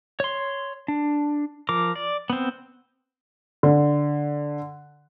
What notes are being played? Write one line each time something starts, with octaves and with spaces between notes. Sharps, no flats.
C#5 C6
D4
F3 A#4 D6
D5
B3 C4
D3